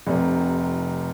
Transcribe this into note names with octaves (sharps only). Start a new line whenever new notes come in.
F1 C3